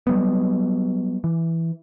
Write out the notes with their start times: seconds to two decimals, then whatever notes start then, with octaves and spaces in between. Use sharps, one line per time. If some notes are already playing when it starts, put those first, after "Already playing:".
0.07 F#3 G3 B3
1.24 E3